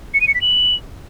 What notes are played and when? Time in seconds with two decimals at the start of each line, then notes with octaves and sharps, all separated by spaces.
0.14 C#7
0.21 D#7
0.28 C#7
0.35 B6
0.41 F#7